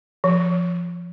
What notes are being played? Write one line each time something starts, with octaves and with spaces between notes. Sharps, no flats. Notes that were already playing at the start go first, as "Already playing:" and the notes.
F3